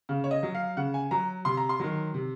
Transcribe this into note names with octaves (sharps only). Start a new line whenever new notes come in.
C#3
C#5
D#5
F#3
F5
C#3 F#5
G#5
F#3 A#5
C3 C6
A#5
C6
D#3 F#3
C3